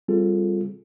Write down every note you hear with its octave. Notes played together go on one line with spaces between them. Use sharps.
G3 C4 F4 G#4 A4